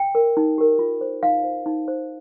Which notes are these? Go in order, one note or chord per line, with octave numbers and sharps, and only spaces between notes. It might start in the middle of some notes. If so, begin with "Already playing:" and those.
Already playing: G5
A#4
D#4
G4 A#4
F4
C5
D#4 F5
C5
D#4
C5